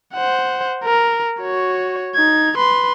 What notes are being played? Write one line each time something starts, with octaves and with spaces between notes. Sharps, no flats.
C5 F#5
A#4
F#4 C#5
D#4 G#6
B4 C6